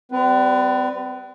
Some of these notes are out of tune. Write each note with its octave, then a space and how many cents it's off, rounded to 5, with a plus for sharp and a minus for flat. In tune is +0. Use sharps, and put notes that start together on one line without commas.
G3 +0 C4 -40 B4 +5